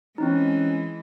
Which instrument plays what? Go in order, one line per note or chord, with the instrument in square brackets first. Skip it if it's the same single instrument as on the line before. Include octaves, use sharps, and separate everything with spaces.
[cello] E3 G#3 [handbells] C4 C#4 D#4